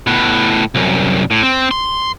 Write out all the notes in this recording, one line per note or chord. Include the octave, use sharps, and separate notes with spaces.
A2 B3
C2 F#2
A2
C4
C6